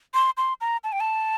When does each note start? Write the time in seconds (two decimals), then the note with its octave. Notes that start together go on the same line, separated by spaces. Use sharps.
0.14 C6
0.37 C6
0.61 A#5
0.84 A5
0.92 G5
1.00 A5